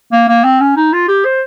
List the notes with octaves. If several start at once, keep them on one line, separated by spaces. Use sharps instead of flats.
A#3
A#3
C4
C#4
D#4
F4
G4
C5